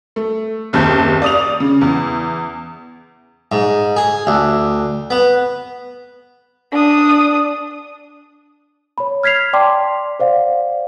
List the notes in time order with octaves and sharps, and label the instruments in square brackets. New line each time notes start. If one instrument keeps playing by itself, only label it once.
[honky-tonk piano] A3
F#1 D#2 C4 A5 G6
D5 D#6 F7
C#3
E2
[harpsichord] G#2
G#4
D2
B3
[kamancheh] D4 D#6
[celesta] C#5 B5
F6 G#6 B6 C7 F7
D5 G5 A5 C6 D6
C5 D5 F5 F#5